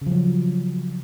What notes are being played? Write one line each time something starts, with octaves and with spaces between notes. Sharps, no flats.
C#3
F3
F#3